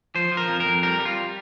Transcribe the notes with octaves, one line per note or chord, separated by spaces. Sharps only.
F3 C5
F3
A#4
F2
A#4
F2
G3 A#4
G3
F4